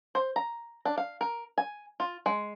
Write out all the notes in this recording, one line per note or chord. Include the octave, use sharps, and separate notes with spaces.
C5
A#5
D4
F5
A#4
G#5
F4
G#3